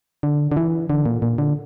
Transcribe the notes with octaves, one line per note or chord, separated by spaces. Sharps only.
D3
D3
E3
D3
A#2
A#2
D3